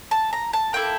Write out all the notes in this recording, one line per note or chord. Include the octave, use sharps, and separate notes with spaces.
A5
A#5
A5
A#3 E4 A4 G5